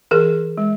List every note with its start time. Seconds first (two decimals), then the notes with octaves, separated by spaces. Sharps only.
0.11 E3 G#4 A#4
0.58 G#3